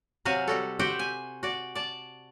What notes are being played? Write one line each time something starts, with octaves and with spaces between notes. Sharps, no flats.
C3 F#3 F#4 F5 G#5
G3 F#4 A4
F#4 G4 C5 E5 F#5 G5
G#5
F#4 D5
D5 A5